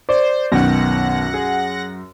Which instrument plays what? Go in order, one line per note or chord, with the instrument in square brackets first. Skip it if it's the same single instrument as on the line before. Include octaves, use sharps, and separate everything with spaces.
[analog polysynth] C5 [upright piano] D5
[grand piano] B1 B2 D#3 [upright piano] F#2 [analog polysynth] F#5 A#6
[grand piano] G#4